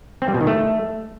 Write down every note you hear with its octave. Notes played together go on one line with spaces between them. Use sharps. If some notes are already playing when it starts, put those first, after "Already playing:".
C4
G3
B2
D#3
A3